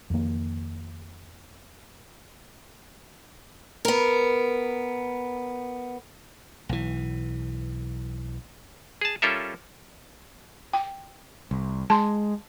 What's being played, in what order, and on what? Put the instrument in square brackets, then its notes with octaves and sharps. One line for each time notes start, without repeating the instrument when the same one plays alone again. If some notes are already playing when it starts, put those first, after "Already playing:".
[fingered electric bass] F2 D#3 A#3
[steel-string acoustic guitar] B3 A#4
[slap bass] B1 E3
[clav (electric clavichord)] G#4 A5
G3 C#4 F4 A4 A#4 E5
[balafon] G5
[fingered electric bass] C2
[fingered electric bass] G#3 [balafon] A5 C6